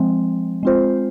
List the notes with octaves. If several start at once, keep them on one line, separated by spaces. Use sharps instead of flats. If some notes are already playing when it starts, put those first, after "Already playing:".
Already playing: F3 G#3 C4
G#3 C4 F4 C5